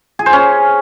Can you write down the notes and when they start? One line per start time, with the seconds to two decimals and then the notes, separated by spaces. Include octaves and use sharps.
0.19 G#4
0.26 C5
0.33 C#4